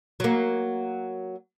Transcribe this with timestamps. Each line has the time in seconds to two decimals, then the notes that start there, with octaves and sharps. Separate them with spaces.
0.20 F#3 A#3